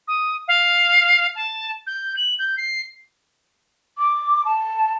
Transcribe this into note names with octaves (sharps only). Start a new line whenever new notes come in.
D#6
F5
A5
G6
F#7
G6
C7
D6
A5